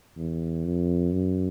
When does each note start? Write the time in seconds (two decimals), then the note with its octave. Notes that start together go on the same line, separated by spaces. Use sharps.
0.17 E2
0.65 F2
1.13 F#2